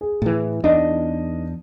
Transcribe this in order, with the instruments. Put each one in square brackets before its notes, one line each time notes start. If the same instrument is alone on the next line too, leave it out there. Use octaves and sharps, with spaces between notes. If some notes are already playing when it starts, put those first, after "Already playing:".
[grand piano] G#4
[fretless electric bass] A2 E3
[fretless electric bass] E2 D4 [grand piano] D#4 D#5